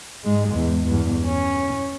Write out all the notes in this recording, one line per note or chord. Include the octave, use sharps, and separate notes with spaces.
G#2 G#3
E2
E2 G2
C#4